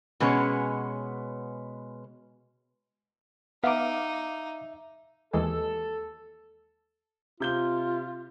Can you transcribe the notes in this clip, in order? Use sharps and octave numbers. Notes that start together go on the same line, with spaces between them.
B2 G#3 B3 C#4 C#5
B3 D#4 E5 F5 D6
D#2 E3 G#3 A4
C3 F4 G6 G7